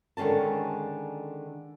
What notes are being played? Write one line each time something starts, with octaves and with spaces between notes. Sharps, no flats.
D3 D#3 G#3 C#4 A5